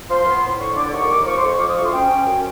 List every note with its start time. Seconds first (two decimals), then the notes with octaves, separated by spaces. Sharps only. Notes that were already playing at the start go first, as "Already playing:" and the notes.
0.09 F3 C6
0.26 B3
0.43 A2
0.59 D3 C#6
0.76 D3 D6
0.92 D#2 C#6
1.09 D#2 D6
1.26 F3 C#6
1.37 C6
1.43 F2
1.48 C#6
1.59 F3 D6
1.68 D#6
1.76 D2 C#6
1.84 C6
1.92 C#4 G5
2.10 C#4
2.26 F#2